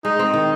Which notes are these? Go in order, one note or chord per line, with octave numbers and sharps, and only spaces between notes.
G#3 D#4
C4
D#3